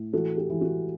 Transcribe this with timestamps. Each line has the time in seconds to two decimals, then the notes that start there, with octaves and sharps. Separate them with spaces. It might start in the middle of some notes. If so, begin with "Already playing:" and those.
Already playing: A2
0.13 E3 F#4 A4
0.37 G4
0.50 E3
0.61 F#4